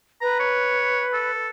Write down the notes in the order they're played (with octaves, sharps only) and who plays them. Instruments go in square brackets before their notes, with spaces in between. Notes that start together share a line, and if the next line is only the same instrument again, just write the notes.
[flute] B4 [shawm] A#5
[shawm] C#5
A4